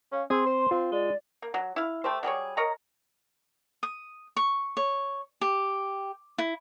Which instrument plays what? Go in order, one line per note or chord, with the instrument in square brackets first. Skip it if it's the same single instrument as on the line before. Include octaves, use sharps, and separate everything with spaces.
[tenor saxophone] C#4 [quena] F5
[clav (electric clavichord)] C4 [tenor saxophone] G#4 [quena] C6
[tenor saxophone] C5
[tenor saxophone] C4 [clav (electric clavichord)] F4
[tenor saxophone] G#3 [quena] D5
[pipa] A#3
F#3
E4 F5
A3 G4 C5
F#3 G3 G#4 C#5
A#4 C#5 D#5 A#5
[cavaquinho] D#6
C#6
C#5
G4
E4